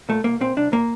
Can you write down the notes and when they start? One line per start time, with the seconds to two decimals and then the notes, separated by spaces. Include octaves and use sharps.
0.09 A#2 A3
0.24 C2 A#3
0.41 A#2 C4
0.57 C2 D4
0.72 A#2 A#3